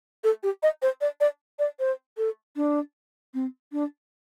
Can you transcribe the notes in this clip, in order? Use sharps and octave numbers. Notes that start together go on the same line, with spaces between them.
A4
G4
D#5
C5
D5
D5
D5
C5
A4
D4
C4
D4